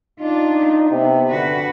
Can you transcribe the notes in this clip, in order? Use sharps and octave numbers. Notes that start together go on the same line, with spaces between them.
D4 D#4 F4
C3 B3
D3 F#4 B4